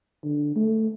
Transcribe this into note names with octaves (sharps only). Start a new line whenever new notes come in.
D3
A3